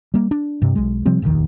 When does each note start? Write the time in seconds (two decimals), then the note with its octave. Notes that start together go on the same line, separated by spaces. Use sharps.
0.14 G3 A#3
0.31 D4
0.62 G2 C3
0.75 B1 G#3
1.06 C3 F3 G3 C4
1.22 F1 A#1 D#2 D#3